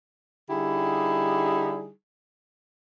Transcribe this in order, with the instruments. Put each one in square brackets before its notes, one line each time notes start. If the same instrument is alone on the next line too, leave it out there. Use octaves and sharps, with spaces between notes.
[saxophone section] D3 G3 D#4 E4 G4 G#4